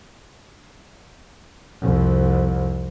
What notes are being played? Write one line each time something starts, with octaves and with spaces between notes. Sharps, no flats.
C2 F2